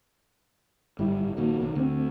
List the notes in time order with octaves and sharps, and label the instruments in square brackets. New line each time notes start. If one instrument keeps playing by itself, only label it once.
[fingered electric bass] G1 [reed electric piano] G#2 G3 E4
[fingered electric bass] A#1 A#2 D#3 [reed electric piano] A#3 F#4
[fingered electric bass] B1 B2 D#3
[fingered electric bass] D2 [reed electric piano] D3 C4